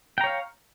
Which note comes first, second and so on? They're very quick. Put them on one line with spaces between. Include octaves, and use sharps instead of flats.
G5 A#5 C#5 F5